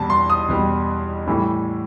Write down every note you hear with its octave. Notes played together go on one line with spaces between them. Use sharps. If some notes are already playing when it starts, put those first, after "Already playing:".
Already playing: E2 B2 G3 A5
C6
D#6
E2 B2 G3
A2 E3 G3